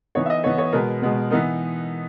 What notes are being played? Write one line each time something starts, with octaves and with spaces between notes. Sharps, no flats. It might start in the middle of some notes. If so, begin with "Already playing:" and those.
E3 B3 D#4 C#5
E5
D#5
E3 B3 D#4 C#5
C#5
B2 G#3 B3 A#4
B2 G#3 B3
E3 B3 D#4 A#4